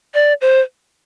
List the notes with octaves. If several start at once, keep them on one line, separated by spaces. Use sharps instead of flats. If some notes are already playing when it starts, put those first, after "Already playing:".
D5
C5